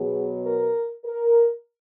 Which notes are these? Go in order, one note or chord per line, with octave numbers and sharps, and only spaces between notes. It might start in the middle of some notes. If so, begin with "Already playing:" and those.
Already playing: B2 F#3 B3 G#4
A#4
A#4